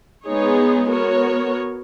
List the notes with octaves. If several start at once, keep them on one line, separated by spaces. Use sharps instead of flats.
G#3 B3 D#4 G#4 C#5
B3 F#4 A#4 C#5